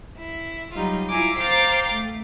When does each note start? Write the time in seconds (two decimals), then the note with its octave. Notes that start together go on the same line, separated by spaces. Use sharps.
0.17 E4
0.73 F#3 G3 D#4 F4
1.08 E4 F4 G#5 A#5 D6
1.39 C5 F5 G5 A#5 D6 A6
1.92 A3